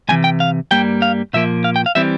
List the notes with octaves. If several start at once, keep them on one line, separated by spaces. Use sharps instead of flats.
C2 C3 E3 G#5
G5
F5
G2 G3 A#3 G5
F5
A#2 F3 A#3 E5
F5
G5
F5
E3 G3 C4 E5